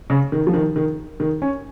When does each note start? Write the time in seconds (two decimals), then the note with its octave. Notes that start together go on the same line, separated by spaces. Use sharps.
0.10 C#3
0.32 D#3
0.47 F3
0.54 D#3
0.76 D#3
1.20 D#3
1.42 C#4